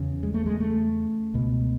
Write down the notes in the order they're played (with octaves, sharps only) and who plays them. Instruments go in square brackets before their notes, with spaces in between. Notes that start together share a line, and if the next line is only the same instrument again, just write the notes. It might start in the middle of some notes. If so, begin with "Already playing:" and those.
Already playing: [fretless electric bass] E2 C#3
G#3
A3
G#3
A3
C#2 B2